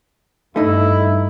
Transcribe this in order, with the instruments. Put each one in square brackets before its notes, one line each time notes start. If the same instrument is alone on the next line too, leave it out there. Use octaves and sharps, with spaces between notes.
[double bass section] G2 [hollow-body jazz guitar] A3 D#4 [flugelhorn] E4